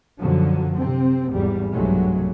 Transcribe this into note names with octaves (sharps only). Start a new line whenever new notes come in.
F#2 B2 D3 F3 F#3
C3 C4
G#1 E2 G3
B1 G2 C3 F#3 G#3 A3